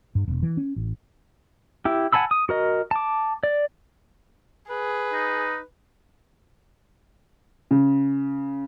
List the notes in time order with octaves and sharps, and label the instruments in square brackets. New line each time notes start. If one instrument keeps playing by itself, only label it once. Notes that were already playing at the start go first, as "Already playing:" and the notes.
[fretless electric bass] G2
E1
E3
C#4
A1
[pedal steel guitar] E4 G4
F#5 G#5 A5 B5 E6
D#6
F#4 A#4 D#5
A5 D6
D5
[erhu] G#4 [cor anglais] B4
[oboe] D#4
[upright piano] C#3